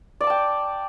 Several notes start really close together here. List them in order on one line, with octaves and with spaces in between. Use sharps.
D5 D6 A5 G5